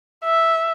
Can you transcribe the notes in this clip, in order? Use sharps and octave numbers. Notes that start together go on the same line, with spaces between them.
E5